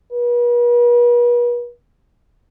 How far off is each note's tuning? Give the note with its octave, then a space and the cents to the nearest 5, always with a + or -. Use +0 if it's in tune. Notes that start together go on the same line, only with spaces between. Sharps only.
B4 -45